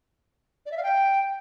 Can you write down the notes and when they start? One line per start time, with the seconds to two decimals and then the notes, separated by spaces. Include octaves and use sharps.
0.66 D5
0.72 E5
0.77 F5
0.83 G5